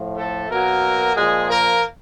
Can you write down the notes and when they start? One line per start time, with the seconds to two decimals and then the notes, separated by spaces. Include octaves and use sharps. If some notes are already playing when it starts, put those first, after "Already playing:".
Already playing: A2 F3
0.17 A3 A4
0.50 B2 F#3 A#3 A#4
1.16 A#2 F3 G#3 G#4
1.49 A#3 A#4